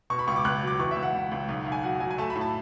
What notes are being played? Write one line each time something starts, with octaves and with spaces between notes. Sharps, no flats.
B2 C#6
B5
C#2 C#6
D6
C#2 F#6
F#3
D6
E3 C#6
E5
C#2
F#5
C#2
C#2
B1
B1
G#5
F#3 F#5
F#3 G#5
G#5
A3 A5
B5
A2
A5